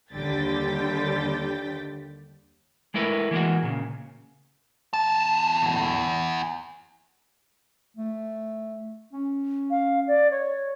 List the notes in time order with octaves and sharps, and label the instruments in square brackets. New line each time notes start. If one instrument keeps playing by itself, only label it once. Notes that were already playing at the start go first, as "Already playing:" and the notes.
[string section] D#2 D3 G3 G5 A6 B6
[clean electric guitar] G#3 A3 E4 A#4 B4
E3 G#3 A#3 F#4
A#2 C#3
[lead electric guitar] E2 A5
[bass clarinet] A3
C#4
[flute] F5
D5
C#5